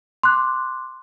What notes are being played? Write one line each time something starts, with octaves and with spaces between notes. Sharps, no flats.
C6 D6 F#6